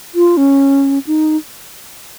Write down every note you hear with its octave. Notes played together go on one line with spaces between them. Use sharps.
F4
C#4
D#4